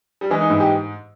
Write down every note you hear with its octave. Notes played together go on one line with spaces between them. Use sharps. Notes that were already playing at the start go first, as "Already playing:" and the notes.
G3
E3 G#3
D#4
G#2 E4
G4